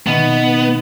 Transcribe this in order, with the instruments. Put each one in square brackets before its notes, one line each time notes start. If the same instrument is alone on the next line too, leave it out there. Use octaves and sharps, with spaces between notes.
[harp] B2 D#3 [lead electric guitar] B3